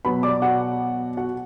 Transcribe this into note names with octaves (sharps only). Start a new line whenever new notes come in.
B2 F#3 B4 B5
D5 D6
F#4 F#5
F#4 F#5